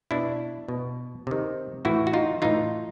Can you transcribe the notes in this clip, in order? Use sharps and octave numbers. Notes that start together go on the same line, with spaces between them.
B2 D4 E4
B2
C3 D#3
A2 E3 E4 F#4
F#4
D#4 F4
A2 E3 D#4 F4